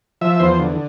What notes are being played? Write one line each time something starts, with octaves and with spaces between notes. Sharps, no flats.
F3 E5
E2 C5
D3